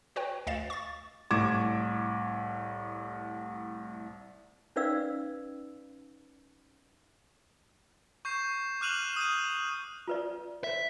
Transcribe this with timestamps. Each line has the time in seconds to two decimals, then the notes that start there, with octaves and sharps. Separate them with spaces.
0.16 F#4 B4 C#5 G5
0.47 D2 D#5 F5 A6 E7
0.70 C#6 A6
1.31 C2 A2 C#6 D6 G#6 E7
4.76 C#4 D#4 B4 D5 F5 E6
8.25 C#6 G6 C7 E7
8.81 D6 F6 F#6 D#7 F7 F#7
9.16 D#6 G6 D#7
10.08 F4 B4 D5
10.64 E5